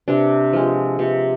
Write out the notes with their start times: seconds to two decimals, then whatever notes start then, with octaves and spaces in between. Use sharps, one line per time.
0.08 C3 D4
0.53 F3 G#3
0.99 C3